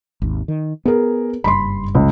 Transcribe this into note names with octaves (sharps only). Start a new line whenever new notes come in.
G#1 D#2
D#3
B3 G#4 A#4
F#1 G2 B5 C6
C#2